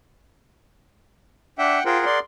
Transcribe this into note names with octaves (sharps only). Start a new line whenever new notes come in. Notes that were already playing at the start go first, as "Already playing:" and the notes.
D4 E5 F#5 G5
F4 G#4 A#4 C5 F#5 G5
D5 C6